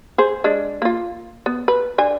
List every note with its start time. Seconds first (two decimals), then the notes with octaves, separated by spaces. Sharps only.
0.18 G#4 C5
0.44 G#3 D4
0.82 A#3 F4
1.46 B3
1.68 B4
1.98 D3 G#5